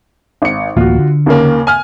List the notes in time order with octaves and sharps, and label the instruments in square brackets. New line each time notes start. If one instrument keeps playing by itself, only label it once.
[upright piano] G#1 C#7
[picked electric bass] D1 A1 A#3 [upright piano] F4 F#4
[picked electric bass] D3
[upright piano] D#2 C#3 A#3
G#5 F6